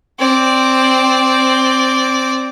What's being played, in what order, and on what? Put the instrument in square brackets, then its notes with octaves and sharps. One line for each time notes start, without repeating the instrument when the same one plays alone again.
[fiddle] C4 D5